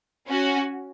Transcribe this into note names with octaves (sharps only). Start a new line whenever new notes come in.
C#4 F#4